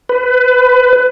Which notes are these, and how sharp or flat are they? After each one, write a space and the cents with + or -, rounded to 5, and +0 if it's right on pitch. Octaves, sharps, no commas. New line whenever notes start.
B4 +25